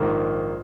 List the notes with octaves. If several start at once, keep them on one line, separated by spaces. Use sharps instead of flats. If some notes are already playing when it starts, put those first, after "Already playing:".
Already playing: A#1 G#2 D#3 A#3